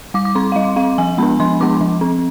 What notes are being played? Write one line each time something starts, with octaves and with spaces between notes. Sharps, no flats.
G3 D6
D6
C4 C6
F5
G3 D#5
C4 F5
F3 G#5
G#3 B3 D4 B5
F3 C6
G#3 B3 D4 D6
F3
C4